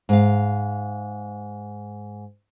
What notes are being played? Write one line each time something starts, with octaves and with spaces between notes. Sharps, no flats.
G#2 F5